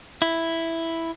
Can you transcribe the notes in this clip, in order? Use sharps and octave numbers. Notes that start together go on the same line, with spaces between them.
E4